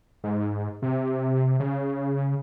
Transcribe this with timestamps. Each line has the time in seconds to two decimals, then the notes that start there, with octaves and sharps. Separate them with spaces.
0.24 G#2
0.82 C3
1.60 C#3